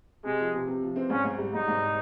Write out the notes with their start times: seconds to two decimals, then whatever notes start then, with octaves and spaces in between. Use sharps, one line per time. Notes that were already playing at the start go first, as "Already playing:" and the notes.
0.24 C3 G#3
0.39 F3
0.54 C3
0.67 C3
0.82 F3
0.96 C4
1.10 G#1 C#4
1.25 G#1
1.38 G3
1.53 G#1 D#4
1.68 G#1